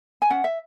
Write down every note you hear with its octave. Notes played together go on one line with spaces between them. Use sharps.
G#5
C#4 F#5
E5